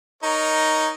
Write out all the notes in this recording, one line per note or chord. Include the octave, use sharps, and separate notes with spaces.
D#4 A#4 C#5